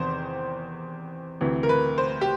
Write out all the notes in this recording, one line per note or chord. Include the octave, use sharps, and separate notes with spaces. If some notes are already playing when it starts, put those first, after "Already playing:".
Already playing: E2 C3 D#3 C5
D2 C3 E3
A#4
B4
C5
G4